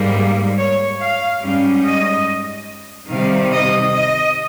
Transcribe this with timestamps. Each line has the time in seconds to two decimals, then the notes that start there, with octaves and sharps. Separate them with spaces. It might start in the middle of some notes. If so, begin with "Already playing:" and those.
Already playing: G#2 G3 A#3
0.58 C#5
1.01 F5
1.42 G#2 G3 C#4
1.84 D#5
3.11 C3 D#3 G3 F5
3.52 D#5
3.94 D#5